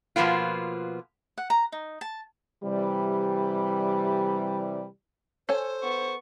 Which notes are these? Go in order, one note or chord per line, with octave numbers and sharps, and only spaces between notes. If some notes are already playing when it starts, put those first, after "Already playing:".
B2 F3 A#3 B3 F4
F#5
A#5
D#4
A5
C3 E3 G3
A4 C5 C#5 G#5
B3 C#6